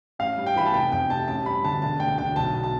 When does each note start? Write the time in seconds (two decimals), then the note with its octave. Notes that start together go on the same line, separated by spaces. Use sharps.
0.19 A1 F5
0.37 G2
0.47 G5
0.56 E3 B5
0.65 A5
0.74 F1 G5
0.92 F2 G5
1.10 C3 A5
1.28 A1 A5
1.46 G2 B5
1.64 D3 A5
1.82 E1 A5
2.00 D2 G5
2.18 D3 G5
2.36 B1 A5
2.54 B2
2.63 A5